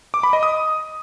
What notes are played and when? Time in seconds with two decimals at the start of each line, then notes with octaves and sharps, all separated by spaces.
0.14 D6
0.23 B5
0.33 D#5
0.43 D#6